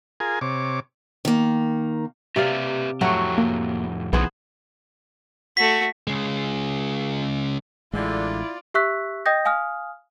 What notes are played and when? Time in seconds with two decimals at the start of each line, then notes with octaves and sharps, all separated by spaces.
0.20 F4 G#4 A#4 G#5
0.41 C3 C#5 D6
1.25 D#3 A#3
2.36 C3 G4 B4 D5 E5 F5
3.01 F2 A2 F#3 A3 F#4 G4
3.38 A#3
4.13 B1 A#2 D#3 E3 B3 G#4 C5
5.57 A3 F#4 B6
6.07 C#3 G#3
7.93 A1 D3 G#3 E4 F4 D5
8.74 G4 E5 C#6 E6 F#6 B6
9.26 D#5 G5 D#6 G6 A#6
9.45 F5 G#5 D#6 F6